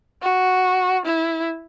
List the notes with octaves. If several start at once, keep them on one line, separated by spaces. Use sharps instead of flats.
F#4
E4